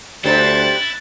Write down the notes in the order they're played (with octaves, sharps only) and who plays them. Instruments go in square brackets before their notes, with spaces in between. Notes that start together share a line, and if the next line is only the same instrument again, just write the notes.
[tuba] D2 [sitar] G3 D4 C5 [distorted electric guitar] E4 [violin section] F#6 A6